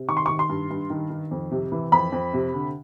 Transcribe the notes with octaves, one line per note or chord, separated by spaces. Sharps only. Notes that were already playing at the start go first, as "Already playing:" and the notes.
Already playing: C3
D#3 C#6
C6
C#6
D#3
C6
G2
G2
D#3
D#3
F2
C3
E3
F2 B5
F2
C3
D3